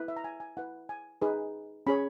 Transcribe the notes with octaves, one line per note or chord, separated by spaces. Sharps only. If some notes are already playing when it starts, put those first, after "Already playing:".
Already playing: E4 B4
E5
A#5
G#5
G#5
E4 B4 F#5
G#5
D#4 G#4 B4
C#4 G#4 C#5 B5